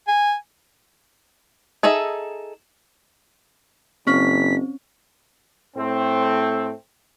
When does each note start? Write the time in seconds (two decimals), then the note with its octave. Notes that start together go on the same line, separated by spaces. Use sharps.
0.08 G#5
1.83 D#4 G#4 A4 D#5 E5
4.07 F#1 C4 C#4 B6
5.77 A2 A3 C4